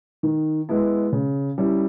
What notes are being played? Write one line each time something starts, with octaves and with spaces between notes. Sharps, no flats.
D#3
G#3 B3 E4
C#3
G3 C#4 E4